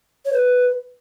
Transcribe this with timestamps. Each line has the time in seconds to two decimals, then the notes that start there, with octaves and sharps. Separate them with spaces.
0.25 C#5
0.33 B4